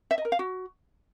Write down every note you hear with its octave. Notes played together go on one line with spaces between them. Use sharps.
E5
D#5
A#4
F5
F#4